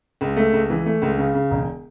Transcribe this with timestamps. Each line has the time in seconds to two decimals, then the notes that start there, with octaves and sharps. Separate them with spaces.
0.21 C#2
0.37 A3
0.53 C#2
0.70 E3
0.86 A3
1.02 C#2
1.18 C#3
1.35 C#3
1.51 E1